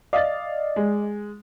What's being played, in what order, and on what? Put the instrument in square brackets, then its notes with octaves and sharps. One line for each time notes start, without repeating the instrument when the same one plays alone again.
[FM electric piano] D5 D#5 [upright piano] F5 A6
[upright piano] G#3